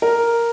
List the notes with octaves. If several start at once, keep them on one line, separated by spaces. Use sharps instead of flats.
A#4